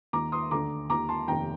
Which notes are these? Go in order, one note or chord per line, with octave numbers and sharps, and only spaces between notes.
D#2 D#3 A#5 D6
C6 D#6
D2 D3 A#5 D6
D#2 D#3 A#5 D6
A5 C6
F1 D#2 D#3 G5 A#5